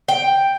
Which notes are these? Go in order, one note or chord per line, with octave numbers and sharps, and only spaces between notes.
G5